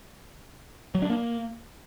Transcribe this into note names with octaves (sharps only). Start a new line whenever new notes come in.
F#3
D4
A#3